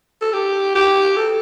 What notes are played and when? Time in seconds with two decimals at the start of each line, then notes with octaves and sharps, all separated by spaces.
0.21 A4
0.33 G4
0.75 G4
1.16 A4